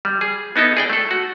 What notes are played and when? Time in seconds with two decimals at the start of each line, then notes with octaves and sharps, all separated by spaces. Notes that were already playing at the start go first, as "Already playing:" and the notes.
0.05 G3
0.21 G#4
0.56 B3 D#4 E4 A4
0.77 G#4 D5 G5
0.90 A3 A4
1.11 F#4